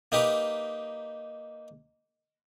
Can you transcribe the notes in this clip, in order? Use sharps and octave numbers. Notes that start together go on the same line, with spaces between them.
A#3 D#4 G4 B4